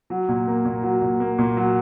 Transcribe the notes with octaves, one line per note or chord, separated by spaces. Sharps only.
F#3
A#2
A#3
A#2
F#3
A#2
A#3
A#2
F#3